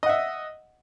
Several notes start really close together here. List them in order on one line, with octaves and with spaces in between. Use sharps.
D#5 F#5 E5